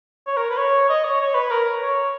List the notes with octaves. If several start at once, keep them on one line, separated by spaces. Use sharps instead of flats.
C#5
A#4
B4
C#5
D#5
C#5
C#5
B4
A#4
C#5